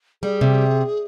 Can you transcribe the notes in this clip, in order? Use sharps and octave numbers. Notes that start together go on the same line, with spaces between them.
G3 G#4
C3